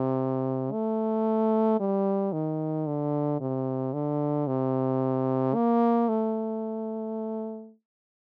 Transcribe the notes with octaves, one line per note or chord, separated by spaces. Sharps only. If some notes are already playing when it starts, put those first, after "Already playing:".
Already playing: C3
A3
G3
D#3
D3
C3
D3
C3
A#3
A3